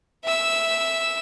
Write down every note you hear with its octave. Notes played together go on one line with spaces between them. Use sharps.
E5 E6